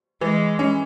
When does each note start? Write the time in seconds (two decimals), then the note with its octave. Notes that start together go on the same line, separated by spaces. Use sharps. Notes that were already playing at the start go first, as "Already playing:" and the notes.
0.21 E3 G#3
0.59 C#4